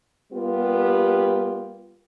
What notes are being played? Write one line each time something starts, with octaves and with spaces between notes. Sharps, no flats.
G3 A#3 B3 F4 G4